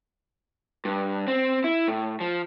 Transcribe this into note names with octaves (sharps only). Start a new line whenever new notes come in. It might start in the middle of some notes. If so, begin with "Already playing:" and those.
G2
C4
E4
A2
F3